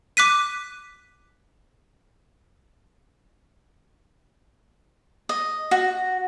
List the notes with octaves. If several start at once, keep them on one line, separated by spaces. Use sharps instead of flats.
D6 F#6 B6 D#7
D#5
F#4